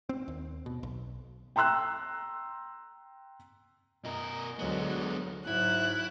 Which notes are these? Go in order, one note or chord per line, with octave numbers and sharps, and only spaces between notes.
C4
D#2
B2
B1
G5 A#5 C6 E6 F#6
F#2 B2 A#4 D#5
D2 F#3 G#3 B3
G#2 F#3 E4 F#6